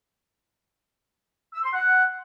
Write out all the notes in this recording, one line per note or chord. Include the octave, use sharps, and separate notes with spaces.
E6
C6
F#5